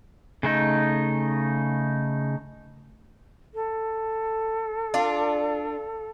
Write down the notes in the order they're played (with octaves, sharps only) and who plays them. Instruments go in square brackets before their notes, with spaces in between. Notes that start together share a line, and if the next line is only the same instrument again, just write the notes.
[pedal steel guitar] C#3 A3 D#4
[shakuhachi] A4
[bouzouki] D4 F4